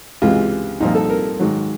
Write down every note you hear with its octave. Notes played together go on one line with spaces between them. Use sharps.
C#2 C3 E3 G#3 F4
C2 A#2 F3 D#4
A4
A#4
G#2 D#3 F#3